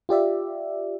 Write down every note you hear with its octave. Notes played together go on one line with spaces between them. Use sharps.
F4 G4 D5 E5